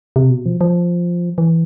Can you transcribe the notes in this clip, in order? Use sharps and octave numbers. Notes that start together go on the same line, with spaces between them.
C3
B2
F3
F3
E3